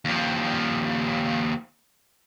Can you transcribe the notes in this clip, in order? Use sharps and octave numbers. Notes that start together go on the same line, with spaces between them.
D#2 F3